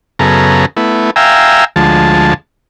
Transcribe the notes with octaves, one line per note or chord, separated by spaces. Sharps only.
F#2 C#3 B3 G#4 A4 A#5
A3 B3 E4
E5 F5 G5 G#5 A#5 E6
D2 F3 G#3 A5